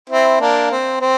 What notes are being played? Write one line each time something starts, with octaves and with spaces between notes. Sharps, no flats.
C4 E4
A#3 D4
C4
C4